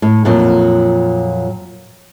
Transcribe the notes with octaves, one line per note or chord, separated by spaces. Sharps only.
A2
F2 A#2 F#3